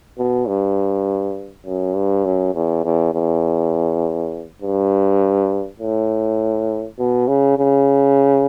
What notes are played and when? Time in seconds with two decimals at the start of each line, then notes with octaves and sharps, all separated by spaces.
0.18 B2
0.48 G2
1.66 F#2
1.96 G2
2.25 F#2
2.54 E2
2.84 E2
3.14 E2
4.62 G2
5.79 A2
6.99 B2
7.28 C#3
7.58 C#3